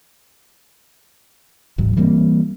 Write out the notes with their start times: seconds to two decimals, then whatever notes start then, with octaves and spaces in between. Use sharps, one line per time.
1.78 D1 A1 G#2 F#3
1.97 E3 G3 A#3 C4